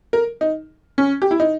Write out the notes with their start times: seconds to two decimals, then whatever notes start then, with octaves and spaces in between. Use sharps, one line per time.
0.13 A#4
0.41 D#4
0.98 C#4
1.22 G4
1.31 E4
1.40 D#4